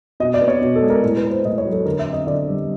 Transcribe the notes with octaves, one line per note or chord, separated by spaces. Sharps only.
B2 D#5
D5
B3
C#5
B2
A4
G#3
A#4
A2 A#4
B4
A#3
C5
A2 D#5
C#5
F#3
A4
D3 A#4
E5
C4
D#5
D3 D5
G3